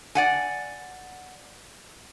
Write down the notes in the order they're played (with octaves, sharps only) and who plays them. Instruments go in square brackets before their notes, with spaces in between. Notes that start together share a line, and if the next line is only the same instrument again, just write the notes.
[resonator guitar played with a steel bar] D5 F#5 G#5